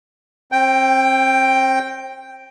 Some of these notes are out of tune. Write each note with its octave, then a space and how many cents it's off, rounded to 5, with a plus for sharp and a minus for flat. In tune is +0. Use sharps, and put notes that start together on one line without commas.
C4 +30 G5 +0